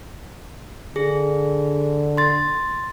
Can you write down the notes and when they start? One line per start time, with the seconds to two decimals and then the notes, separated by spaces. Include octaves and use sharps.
0.96 D3 G#4
2.17 C6 A6